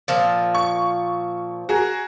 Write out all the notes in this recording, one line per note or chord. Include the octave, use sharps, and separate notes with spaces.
A#2 F3
C#6
F#4 G#4 A#4